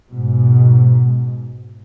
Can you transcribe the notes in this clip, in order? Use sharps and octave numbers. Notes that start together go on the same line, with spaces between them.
G#2 B2